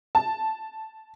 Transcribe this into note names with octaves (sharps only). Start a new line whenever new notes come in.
A5